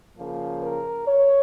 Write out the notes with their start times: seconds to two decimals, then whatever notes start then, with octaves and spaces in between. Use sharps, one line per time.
0.16 C#3 F3 A#3
0.61 A#4
1.07 C#5